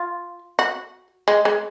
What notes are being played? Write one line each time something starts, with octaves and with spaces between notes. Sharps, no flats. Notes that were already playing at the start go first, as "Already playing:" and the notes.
Already playing: F4
F#4
G#3
G#3